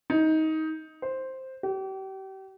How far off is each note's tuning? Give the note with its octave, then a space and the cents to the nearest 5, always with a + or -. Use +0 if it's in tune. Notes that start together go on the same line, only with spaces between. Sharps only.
D#4 +20
C5 +5
G4 -35